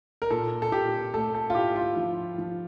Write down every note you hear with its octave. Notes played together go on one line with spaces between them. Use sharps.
A#4
A#2 A4
A4
A#2 G4
A3 A4
A4
F4
E4 G4
F4
F3
F3